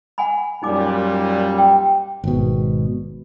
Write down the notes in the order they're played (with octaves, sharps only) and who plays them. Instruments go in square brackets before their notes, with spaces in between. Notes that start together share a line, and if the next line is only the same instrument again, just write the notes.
[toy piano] F#5 G#5 B5
[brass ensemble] F#2 A#2 G3 [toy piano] D#4 D6
[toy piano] G5
[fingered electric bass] G#1 B2